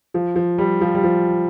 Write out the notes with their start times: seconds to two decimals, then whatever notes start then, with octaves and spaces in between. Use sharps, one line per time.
0.14 F3
0.36 F3
0.58 G3
0.81 F3
0.95 G3
1.04 F3